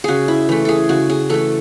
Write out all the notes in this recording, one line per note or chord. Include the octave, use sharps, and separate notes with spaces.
C#3 F#4 G#4
E4
E3 A3
G#4 A4
C#3 F#4
G#4
E3 A3 A4